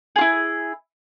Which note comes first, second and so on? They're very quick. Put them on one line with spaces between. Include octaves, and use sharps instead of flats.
G#4 F4 E4